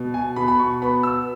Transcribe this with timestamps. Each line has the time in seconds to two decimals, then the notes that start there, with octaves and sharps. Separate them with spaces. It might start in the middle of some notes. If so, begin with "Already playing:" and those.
Already playing: B2
0.14 G#5
0.36 B2 B5
0.48 B5
0.59 C#6
0.82 B3 B5
1.03 E6